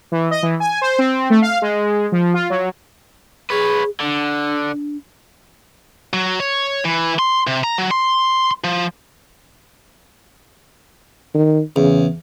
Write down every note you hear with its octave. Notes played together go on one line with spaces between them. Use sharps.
E3
D#5
E3
G#5
C5
C4
A3
F5
G#3
F3
F4
F#3
G#4 B4 C#5
D3 D4
F#3
C#5
E3
C6
C3
A#5
F#3
C6
F3
D#3
E2 C#3